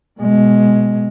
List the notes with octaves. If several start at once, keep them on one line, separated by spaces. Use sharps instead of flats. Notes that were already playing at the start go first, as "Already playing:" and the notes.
B2 G#3